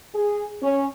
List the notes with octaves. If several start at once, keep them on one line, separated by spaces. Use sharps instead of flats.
G#4
C#4